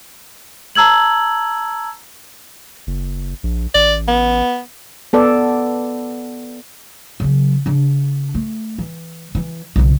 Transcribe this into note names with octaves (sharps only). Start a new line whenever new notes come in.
A5 A#5 E6 G#6 F#7
F#1
A#1
A1 D5
B3
B3 A4 D5
C#3 F#3
C#3 D4
A3
E3
E3 E4
B1 C#3